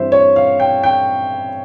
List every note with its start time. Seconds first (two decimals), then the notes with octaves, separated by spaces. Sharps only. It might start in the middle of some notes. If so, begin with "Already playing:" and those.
Already playing: G2 E3 G3 C4 C5 E5
0.12 C#5
0.36 F5
0.60 G5
0.83 G5